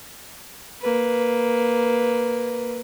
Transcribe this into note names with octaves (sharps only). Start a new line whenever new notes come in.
A#3 B4